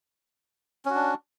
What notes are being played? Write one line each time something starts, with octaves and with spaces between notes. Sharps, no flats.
C#4 D4 F#4